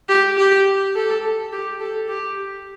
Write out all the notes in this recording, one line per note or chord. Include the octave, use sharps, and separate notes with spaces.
G4
G4
A4
G4
A4
G4